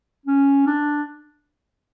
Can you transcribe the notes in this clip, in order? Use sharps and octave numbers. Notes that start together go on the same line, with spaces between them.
C#4
D4